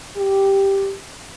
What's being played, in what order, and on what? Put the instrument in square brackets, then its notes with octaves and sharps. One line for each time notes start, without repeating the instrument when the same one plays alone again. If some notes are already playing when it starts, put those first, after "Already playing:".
[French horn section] G4